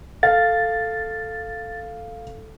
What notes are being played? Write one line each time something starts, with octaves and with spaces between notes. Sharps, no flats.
A4 F5 A6